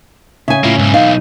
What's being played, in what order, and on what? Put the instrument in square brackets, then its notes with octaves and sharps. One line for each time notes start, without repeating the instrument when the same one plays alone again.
[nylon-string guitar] C#3 G#5 [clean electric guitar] E5
[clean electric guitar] A2 E4 F4 [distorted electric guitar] A#3 C#4
[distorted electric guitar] B1 E3 [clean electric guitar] G#2
[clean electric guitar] D#4 [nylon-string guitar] F5